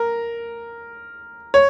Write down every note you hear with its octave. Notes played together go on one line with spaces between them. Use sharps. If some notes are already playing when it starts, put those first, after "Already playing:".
Already playing: A#4
C#5